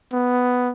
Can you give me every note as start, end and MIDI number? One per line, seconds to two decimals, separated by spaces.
0.13 0.72 59